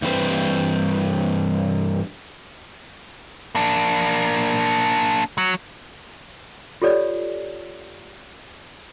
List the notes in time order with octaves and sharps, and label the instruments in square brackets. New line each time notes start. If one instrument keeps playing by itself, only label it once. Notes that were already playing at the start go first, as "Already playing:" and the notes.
[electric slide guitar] G2 E3 C4 B4 C5
[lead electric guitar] A#3 D4
F#3
[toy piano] F4 G4 A4 C#5 D5